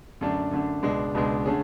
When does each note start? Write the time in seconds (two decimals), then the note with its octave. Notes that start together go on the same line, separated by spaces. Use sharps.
0.21 F#2 D3 A3 D4
0.51 F#2 D3 A3 D4
0.83 C#2 B2 G#3 D4
1.14 C#2 B2 G#3 D4
1.45 D3 A3 C#4 G#4